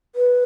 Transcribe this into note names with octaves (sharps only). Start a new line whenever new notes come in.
B4